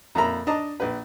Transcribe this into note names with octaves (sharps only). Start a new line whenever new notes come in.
F2 A#2 A#4 E5 A#5 B5
D4 D#5 A5 A#5
A#1 B4